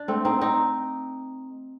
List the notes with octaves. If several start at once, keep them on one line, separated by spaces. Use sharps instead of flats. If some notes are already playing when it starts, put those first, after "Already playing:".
Already playing: D4
A3 C4
C4 D#4
C4 D#4